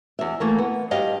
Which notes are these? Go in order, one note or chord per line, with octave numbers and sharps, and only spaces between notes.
E2 E5
E3 A3 A#3
B3
G2 G4 D#5 F5